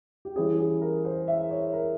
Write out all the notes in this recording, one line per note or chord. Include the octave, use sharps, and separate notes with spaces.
G4
E3 G3 C#4 E4 G#4
G#4
A#4
C5
E5
C#5
A#4